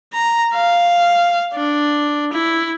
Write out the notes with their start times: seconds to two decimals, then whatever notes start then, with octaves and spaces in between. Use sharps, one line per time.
0.13 A#5
0.54 F5
1.55 D4
2.33 E4